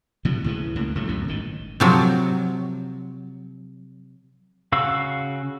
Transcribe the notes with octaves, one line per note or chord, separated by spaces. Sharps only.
A2 C3 F3 F#3
C#2 A2 C#3 E3
C#2 A2 A#3
C#2 A2 F#3 A3
C#2 F#2 B2
G#1 A2 D#3
C3 F3 F#3
C#3 F#4 F5 E6